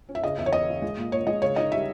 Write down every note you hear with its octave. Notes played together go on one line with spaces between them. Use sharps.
C#4
E5
C#3 D#5
E2 E5
C#5
E2 D#5
C#3
G#3
A#2
A#2 C#5
G#3 D#5
C#3 C#5
D#4 D#5
G3 E5